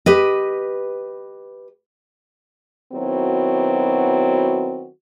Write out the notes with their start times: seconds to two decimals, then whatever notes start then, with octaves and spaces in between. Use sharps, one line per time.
0.06 G4 B4 D#5
2.93 D#3 F#3 B3 C4 E4 F#4